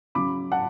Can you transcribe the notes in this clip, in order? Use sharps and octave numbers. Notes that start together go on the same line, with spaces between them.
C#3 F#3 B5 D6
F#5 A5